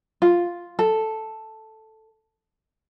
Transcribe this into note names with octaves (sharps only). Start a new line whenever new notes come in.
F4
A4